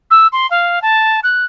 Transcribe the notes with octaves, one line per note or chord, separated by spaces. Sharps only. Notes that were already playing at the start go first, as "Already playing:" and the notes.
E6
C6
F5
A5
F#6